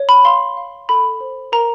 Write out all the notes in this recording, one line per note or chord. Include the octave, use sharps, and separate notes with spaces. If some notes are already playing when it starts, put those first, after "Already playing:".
Already playing: C#5
B5
F5 C6
F5
A4 B5
C5
A#4 A#5